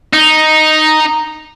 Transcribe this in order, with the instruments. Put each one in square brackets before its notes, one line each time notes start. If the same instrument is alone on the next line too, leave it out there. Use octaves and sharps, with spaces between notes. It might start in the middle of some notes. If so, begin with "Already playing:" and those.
[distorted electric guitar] D#4